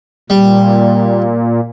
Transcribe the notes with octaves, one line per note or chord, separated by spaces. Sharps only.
A#2 G3